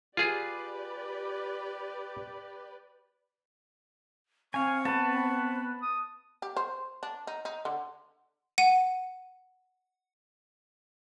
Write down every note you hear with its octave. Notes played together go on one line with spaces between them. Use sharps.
F4 G4 G#4 B4 D5
C4 F5 G#5 C#6
B3 B4 A5
D#6
G4
C5
D4
D#4
D#4
D3
F#5 D#7